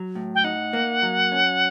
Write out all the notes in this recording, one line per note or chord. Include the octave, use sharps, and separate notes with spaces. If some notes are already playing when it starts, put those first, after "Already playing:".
Already playing: F#3
A2
G5
D#4 F#5
A#3
F#3
C#4